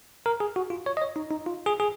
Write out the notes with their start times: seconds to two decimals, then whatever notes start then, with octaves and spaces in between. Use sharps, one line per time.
0.26 A#4
0.40 G#4
0.56 F#4
0.70 F4
0.86 C#5
0.97 D#5
1.02 C#5
1.16 D#4
1.31 D#4
1.46 F4
1.66 G#4
1.80 G#4